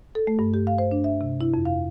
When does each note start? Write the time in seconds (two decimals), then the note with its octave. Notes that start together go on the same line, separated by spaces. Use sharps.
0.15 A4
0.27 A3
0.39 G2
0.54 G4
0.67 F5
0.78 C5
0.91 D4
1.04 E5
1.21 C3
1.41 E4
1.54 F2
1.65 F5